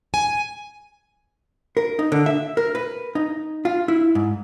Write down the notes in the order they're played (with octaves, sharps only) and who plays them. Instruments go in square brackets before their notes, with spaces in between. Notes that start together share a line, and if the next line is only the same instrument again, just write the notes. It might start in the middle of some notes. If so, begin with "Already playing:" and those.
[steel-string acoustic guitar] G#5
[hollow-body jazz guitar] A#4
D#4
D3
E5
A#4
B4
D#4
F4
E4
G#2